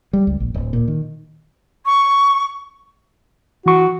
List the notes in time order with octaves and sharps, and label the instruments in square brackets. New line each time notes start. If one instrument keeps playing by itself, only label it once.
[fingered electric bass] G3
C#2
A#1
D1
A#2
D#3
[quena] C#6
[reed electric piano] E3 C#6 [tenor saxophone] F#4